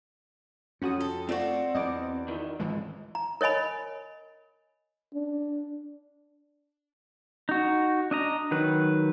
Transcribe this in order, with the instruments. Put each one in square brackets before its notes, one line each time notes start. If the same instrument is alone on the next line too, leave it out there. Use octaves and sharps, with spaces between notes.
[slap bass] F2 [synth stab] C#4 F#4 D#6
[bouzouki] A4
[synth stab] A3 F4 [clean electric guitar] C4 [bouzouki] F#4 D5
[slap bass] E2 [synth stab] D#5 D6
[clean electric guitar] D#3 E3
[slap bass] G#1 E3 G#3 [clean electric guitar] F2
[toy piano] A#5
A#4 C#5 D#5 G#5 B5
[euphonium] D4
[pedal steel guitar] D#4 F#4
D4 D#5 A#5
D#3 F#3 B4